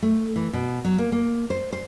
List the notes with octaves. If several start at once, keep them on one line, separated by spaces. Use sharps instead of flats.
A3
E3
B2
F#3
A#3
A#3
C5
C5